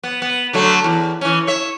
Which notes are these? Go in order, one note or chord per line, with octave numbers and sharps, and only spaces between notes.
B3
B3
D3 F#3 A3
E2
E3 C#4
C#5 E5